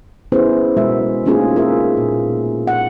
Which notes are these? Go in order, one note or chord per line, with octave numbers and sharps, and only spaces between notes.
B3 C#4 E4 G#4 B4 C5
B2 G#3 F#4 A#4 E5
A3 A#3 C#4 D#4 F4 G#4
F4 A#4 E5
A#2
F#5